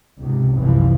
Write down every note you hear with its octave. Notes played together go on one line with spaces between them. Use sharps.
C#2 G#2 C3
F1 C2 F#2 E3 F3